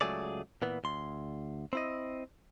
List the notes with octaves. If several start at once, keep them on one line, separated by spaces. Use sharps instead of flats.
C#2 F#3 A3 G#4 D5
A#2 E3 B3
D2 C6
C4 E4 D#5